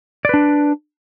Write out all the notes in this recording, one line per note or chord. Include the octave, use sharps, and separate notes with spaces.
D4 B4 D5